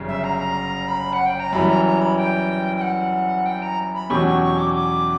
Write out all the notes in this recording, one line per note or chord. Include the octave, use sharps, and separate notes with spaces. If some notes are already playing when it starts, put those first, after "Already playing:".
Already playing: G1 F#2 C#3 G3 C#4
E5
A#5
B5
F#5
G5
A#5
F#2 E3 G3 B5
A#5
A#5
B5
G5
G5
F#5
G5
A#5
B5
E2 B2 F#3 C#4 G4 C#6
C#6
C#6
D6
D6